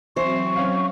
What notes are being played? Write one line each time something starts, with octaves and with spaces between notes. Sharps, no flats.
E3 F#3 C4 C5 C#6
C#4 F5